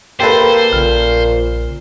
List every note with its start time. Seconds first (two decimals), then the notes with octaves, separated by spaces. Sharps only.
0.20 A#3 G4 A4 B4 C5
0.73 A#1 A#2 C#3 F6